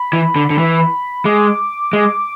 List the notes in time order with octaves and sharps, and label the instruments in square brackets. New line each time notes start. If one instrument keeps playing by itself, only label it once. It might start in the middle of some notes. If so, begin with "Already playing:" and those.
Already playing: [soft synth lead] B5
[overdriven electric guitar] E3
D3
D3
E3
[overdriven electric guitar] G#3 [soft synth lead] D6
[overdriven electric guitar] G#3